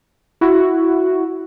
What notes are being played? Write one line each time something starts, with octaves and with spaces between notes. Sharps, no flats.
E4 F#4